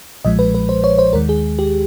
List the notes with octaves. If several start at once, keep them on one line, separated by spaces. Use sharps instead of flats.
B1 A#2 F3 G#3 D#5
B4
B4
C5
C#5
C5
D#2 D#3 G#3 A#4
G#4
G4